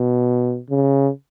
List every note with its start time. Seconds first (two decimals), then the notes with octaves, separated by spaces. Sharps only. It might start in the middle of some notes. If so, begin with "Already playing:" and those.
Already playing: B2
0.70 C#3